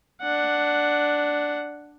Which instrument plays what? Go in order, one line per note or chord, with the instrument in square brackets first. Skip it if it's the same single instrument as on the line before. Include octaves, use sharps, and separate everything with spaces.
[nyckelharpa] D4 F#5